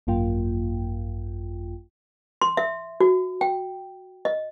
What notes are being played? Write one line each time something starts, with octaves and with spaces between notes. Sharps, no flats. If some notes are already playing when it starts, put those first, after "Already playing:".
G#1 F#2 A#3 F4 G5
C6
E5
F#4
G5
D#5